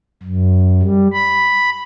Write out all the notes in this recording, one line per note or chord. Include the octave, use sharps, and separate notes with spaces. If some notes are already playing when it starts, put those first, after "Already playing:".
F#2
G3
B5